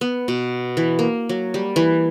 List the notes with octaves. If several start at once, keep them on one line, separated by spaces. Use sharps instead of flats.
B3
B2
E3
A#3
F#3
G3
E3